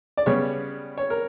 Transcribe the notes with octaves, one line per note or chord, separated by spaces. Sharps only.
D5
C#3 G3 B3 C#5
C#5
A#4